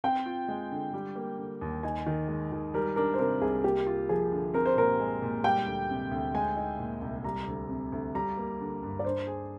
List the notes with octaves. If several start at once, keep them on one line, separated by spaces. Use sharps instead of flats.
C4 G5
F4
G#3
D3
G3
A#3
D3
D#2
D#4 G#5
D#3
G#3
D#3
G3 A#4
D4 A#4
C5
C3 A#4
C2 G#4
A#3 G4
F4
F3 G#4
D3
C4 A#4
C5
A#2 A#4
G#3
A#2
G3 G5
D2
C3
D2
G#3 G#5
D#4
A#2
C2
G3 A#5
D2
C3
D2
G3 A#5
A#3
D3
G2
D5
D4 C5
G#4